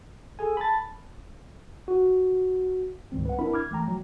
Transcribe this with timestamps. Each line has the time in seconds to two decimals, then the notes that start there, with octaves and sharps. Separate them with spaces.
0.39 G#4 A4 G#5
0.57 A5 B5 A6
1.88 F#4
3.12 C#2 G#2 D#3 G3 C4
3.26 B4 F#5
3.39 C4 D4 E4 A#4 E5 B5
3.54 D6 F6 G#6
3.71 E3 A3 G5 A#5
3.88 F#3